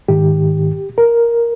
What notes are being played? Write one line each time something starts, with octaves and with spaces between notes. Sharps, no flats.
G#2 D#3 G4
A#4